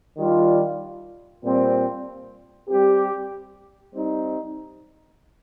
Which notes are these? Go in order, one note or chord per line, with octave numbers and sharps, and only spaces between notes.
D#3 G3 D4 F4
A#2 G3 C4
G3 C4 G4
G3 C4 D#4